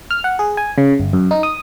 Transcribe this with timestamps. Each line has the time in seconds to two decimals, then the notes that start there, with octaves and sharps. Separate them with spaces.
0.11 F6
0.24 F#5
0.39 G#4
0.57 G#5
0.78 C#3
1.00 G1
1.13 F#2
1.31 D#4
1.43 D#6